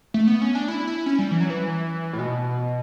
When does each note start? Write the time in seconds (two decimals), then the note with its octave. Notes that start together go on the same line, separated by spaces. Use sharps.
0.14 A3
0.27 B3
0.42 C#4
0.55 D4
0.68 E4
0.87 E4
1.06 C#4
1.19 G3
1.31 E3
1.41 F#3
1.50 E3
2.13 A2
2.19 B2